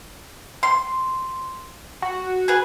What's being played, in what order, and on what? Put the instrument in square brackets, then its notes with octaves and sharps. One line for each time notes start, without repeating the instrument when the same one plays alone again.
[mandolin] C6
[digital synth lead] F#4
[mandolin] G#4 B4